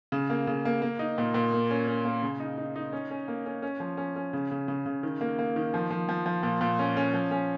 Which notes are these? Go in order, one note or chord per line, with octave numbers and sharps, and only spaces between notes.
C#3
A#3
C#3
A#3
A#3
D#4
A#2
A#2
A#3
C#4
C#4
A#3
C#3
D#4
D#4
D#4
C#4
C#4
A#3
C#4
C#4
F3
C#4
C#4
C#3
C#3
C#3
C#3
D#3
A#3
A#3
D#3
F3
F3
F3
F3
A#2
A#2
C#4
C#4
F3
C#4